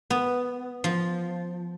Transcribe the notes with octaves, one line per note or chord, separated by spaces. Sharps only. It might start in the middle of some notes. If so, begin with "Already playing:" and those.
B3
F3